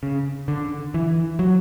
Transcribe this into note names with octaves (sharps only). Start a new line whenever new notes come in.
C#3
D3
E3
F#3